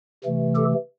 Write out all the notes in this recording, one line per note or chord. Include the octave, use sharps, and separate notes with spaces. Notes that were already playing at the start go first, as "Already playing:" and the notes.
C3 E3 A3
G4 A4